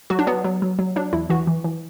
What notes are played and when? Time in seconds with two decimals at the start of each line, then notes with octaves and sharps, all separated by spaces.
0.10 F#3 F#4
0.19 D4
0.27 F#3 B3
0.44 F#3
0.62 F#3
0.79 F#3
0.96 F#3 D4
1.12 E2 E4
1.30 E3 F#4
1.47 E3
1.64 E3